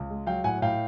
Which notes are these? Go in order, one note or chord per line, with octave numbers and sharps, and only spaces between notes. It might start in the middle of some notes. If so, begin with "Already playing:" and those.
Already playing: C#2
G#3
F#3 F5 G5
A2 F#5 G#5
A2 F5 G5